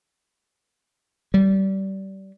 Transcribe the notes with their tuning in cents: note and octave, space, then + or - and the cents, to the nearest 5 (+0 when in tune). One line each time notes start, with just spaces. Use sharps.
G3 -25